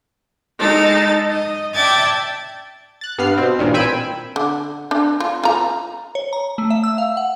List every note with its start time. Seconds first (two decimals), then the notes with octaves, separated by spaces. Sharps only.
0.59 G#3 D#4 A4 A6
1.28 D#5
1.74 D5 E5 G5 A5 G#6 A6
3.01 F#6 A6
3.18 G2 B3 F6 C7
3.37 B2 C4
3.58 A1 G2 A#2 D#3
3.74 A#2 C4 G#5 B5 E6 D7
4.36 D3
4.91 D4
5.20 F4
5.43 F4 A#5
6.15 C#5
6.33 A#5
6.58 A3
6.70 E5
6.84 E6
6.98 F5
7.17 F#5